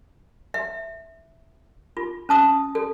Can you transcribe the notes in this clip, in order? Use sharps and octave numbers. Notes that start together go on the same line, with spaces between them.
E5
F4
C#4 A5 D#6
A4